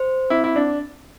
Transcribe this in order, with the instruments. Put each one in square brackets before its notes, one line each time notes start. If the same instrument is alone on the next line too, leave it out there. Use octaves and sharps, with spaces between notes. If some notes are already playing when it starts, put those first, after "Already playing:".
Already playing: [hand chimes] C5
[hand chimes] C4 [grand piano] E4
[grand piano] E4
D4